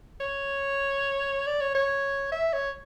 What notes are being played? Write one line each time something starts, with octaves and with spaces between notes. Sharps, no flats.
C#5
D5
C#5
C#5
E5
C#5